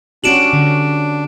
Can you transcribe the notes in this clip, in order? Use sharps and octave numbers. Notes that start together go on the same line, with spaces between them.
C#4 D4 F#4 G4 D7 E7 F#7
D3